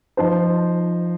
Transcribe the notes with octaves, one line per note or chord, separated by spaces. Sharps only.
F3 D#4 C5